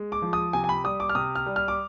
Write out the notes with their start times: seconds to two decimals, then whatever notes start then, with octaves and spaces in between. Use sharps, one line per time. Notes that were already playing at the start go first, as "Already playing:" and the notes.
Already playing: G#3
0.12 D6
0.22 F3
0.33 D#6
0.53 C3 G#5
0.64 G#5
0.69 B5
0.84 G3 D#6
1.00 D6
1.09 F6
1.15 C3 D#6
1.35 F6
1.46 G3
1.56 F6
1.68 D6